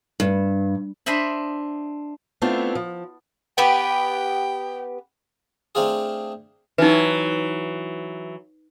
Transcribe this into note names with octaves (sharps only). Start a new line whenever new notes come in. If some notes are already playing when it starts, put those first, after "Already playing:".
G2
D4 C5 D#5 E5 B5
A3 B3 C4 D4 E4 F4
F3
B3 G4 B4 G5
A3 C4 D4 F4 G#4
E3 F#3 D#4 B4